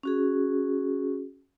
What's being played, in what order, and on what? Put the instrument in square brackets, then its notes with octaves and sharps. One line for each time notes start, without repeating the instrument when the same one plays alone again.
[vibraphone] C#4 F#4 G#4